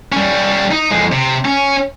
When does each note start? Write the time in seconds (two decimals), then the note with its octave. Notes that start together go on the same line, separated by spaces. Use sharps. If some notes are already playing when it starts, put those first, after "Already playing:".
0.12 G3 C#4
0.71 D#4
0.91 F2 G#3
1.12 C3
1.45 C#4